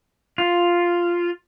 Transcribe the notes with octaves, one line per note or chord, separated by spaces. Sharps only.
F4